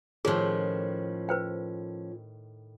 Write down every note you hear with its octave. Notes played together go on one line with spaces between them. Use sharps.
A2 D#3 F3 C#4 G#4
B4 C5 G5